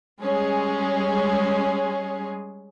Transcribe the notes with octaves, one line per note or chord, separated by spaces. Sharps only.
G3 G#3 C#4 G#4